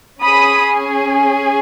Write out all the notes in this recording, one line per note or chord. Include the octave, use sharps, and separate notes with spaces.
C#4 G#4 B5 D#6